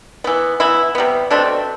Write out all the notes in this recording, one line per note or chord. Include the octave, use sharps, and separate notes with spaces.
E3 B3
E3 B3 E4
C3 G3 B3
B2 A3 C4 D4